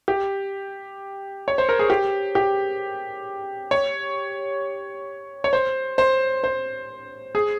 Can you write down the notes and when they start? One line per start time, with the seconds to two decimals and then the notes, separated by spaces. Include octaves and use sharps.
0.08 G4
1.48 C#5
1.58 C5
1.69 A#4
1.79 G#4
1.90 G4
2.35 G4
3.71 C#5
5.44 C#5
5.53 C5
5.98 C5
6.44 C5
7.35 G#4